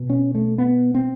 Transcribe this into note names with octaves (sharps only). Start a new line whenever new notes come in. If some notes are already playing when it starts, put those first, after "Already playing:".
Already playing: B2
C#4
A3
B3
C4